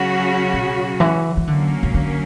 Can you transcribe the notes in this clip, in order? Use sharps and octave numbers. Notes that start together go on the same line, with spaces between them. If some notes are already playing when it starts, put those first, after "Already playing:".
Already playing: C#3 F#3 C#4 F#4
B2
E3
E3
D3 F#3 A#3 C#4
C#3
D3